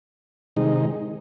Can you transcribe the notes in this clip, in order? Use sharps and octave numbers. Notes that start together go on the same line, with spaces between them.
C3 D#3 G#3 D#4